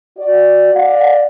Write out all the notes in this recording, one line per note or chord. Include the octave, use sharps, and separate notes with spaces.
F#4 D5
D5 F5 F#5